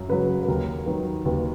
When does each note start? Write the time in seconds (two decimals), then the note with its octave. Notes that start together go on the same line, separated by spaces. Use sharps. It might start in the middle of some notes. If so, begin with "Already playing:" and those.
Already playing: F#2
0.09 C#3 F#3 B4
0.43 B4
0.48 D#2 A#4
0.86 D#3 F#3 B4
1.25 D#2 B4